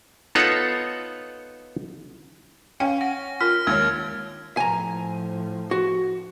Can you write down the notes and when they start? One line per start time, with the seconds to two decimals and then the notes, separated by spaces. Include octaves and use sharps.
0.35 B3 D#4 F4 A4 C#5 F#5
2.80 C#4 F5 G5
3.01 F#5 A#6
3.41 F4 A#4 F6
3.67 D#2 D#3 G#3 C#5 G#6
4.57 A2 F3 G#5 A#5
5.71 F#4